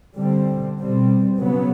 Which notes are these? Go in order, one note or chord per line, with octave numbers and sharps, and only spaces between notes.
D3 G3 C4
B2 G3 C4
C#3 F#3 B3